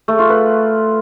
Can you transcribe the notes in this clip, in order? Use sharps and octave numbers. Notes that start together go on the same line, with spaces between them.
A3
F4
B4